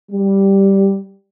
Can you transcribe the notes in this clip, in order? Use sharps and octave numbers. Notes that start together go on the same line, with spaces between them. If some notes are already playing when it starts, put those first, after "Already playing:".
G3